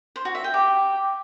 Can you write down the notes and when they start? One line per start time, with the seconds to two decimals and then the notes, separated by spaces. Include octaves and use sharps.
0.16 C5
0.25 F#4
0.35 E5
0.44 G5
0.54 G4